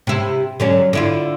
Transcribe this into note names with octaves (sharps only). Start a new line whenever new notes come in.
C3 E4
D3 F#3 C#4
D3 E4 F4